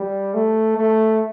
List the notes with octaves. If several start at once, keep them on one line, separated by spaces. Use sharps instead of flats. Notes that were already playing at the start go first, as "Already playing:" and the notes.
Already playing: G3
A3
A3